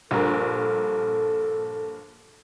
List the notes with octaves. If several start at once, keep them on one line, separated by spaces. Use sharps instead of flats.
A#1 G2 A4 A#4